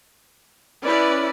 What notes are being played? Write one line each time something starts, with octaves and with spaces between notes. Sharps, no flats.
C#4 E4 B4 D5